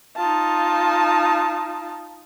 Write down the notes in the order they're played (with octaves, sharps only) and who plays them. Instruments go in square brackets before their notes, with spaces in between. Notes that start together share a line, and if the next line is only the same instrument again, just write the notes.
[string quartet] D#4 F4 A5